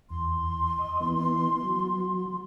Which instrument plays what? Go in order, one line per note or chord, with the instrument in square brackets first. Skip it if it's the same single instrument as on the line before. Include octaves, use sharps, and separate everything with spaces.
[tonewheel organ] E2 [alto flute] C6
[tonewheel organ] D#5
E3 B3
F#3